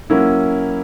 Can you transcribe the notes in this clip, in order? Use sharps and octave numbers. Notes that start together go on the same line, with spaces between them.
F#3 A#3 C#4 E4